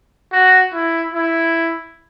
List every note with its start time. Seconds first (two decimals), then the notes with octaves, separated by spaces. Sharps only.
0.32 F#4
0.73 E4
1.14 E4